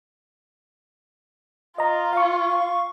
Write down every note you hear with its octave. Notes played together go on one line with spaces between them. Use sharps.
F4 D#5 A#5
F5 C#6